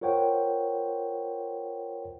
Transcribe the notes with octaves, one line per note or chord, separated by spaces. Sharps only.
F4 A#4 C5 C#5 F#5 G5